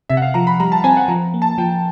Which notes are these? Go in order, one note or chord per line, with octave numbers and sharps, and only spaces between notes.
C3 E5
F#5
F5
F3 A#5
B5
G3 A#5
A5
C4 G#5
F#5
F3 A#5
A#3
A5
F3 G5